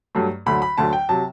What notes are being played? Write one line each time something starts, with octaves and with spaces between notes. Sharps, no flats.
G2 F#3 A3
D2 D3 F#3 B5
B5
D2 D3 F#3 A5
G5
C3 F#3 A5